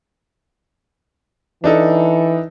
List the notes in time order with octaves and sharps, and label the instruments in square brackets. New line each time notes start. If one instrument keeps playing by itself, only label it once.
[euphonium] E3 [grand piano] D4 D#4 A4